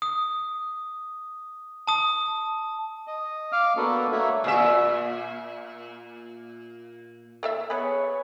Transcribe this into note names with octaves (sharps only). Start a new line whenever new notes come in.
D#6
A5 D#6
D#5
F5 D6 F6
A#3 B3 D4 F#4 A4
A3 A#3 F#4 C#5 E5
A#2 E5
A#3 A4 E5
B3 G#4 B4 C#5 B5